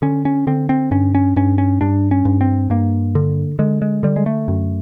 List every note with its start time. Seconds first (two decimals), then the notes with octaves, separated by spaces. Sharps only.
0.02 D3 C#4
0.25 C#4
0.47 D3 C4
0.69 C4
0.91 G2 C#4
1.15 C#4
1.36 G2 C#4
1.58 C#4
1.81 G2 D4
2.11 C#4
2.25 G2
2.41 C4
2.70 G2 A#3
3.15 D3
3.59 D3 G#3
3.82 G#3
4.03 D3 G3
4.16 G#3
4.26 A3
4.48 F#2